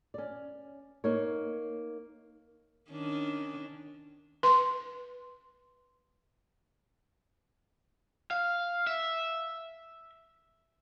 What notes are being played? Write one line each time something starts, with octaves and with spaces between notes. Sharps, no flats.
C#4 D5
A#3 D#4 C#5
D#3 C#4 D4
B4 C6
F5
E5